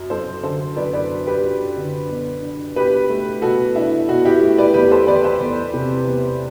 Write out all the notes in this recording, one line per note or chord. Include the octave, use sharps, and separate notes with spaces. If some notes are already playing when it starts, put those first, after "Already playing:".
Already playing: F#2 F#3
F#2 A4 C5
D3 A4 C5
F#2 B4 D5
B4 D5
F#3
G4 B4
F#2
D3
B2
D4
B2 G4 B4
A3
B2 F#4 A4
D4 E4
B2 F#4
E4 G4
A3
B4 D5
E2 G4 B4
A4 C5
E3 B4 D5
A4 C5
E2
C3
E2